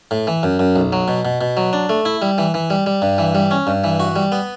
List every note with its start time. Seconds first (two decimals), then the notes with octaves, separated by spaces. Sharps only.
0.11 A2
0.27 E3
0.43 F#2
0.59 F#2
0.76 B1
0.93 F#3
1.08 B2
1.25 B2
1.41 B2
1.57 F#3
1.73 D4
1.89 A3
2.05 E4
2.22 G3
2.38 E3
2.54 E3
2.70 G3
2.86 G3
3.02 G2
3.18 E3
3.35 G3
3.51 C#4
3.67 G2
3.84 E3
4.00 F#4
4.16 G3
4.32 B3